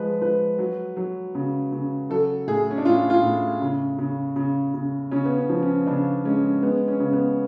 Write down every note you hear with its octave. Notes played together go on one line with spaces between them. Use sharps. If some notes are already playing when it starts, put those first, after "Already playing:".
Already playing: F3 G#3 B4
F3 B4
F#3
F#3
C#3
C#3
F#3 A4
A2 G#4
C#4
D4
A2 F4
F4
A2
C#3
C#3
C#3
C#3
C#3 C#4
B3
C#4
F3
C#4
C#3 D4
G#3 C#4
G#3 B3
C#4
C#3
B3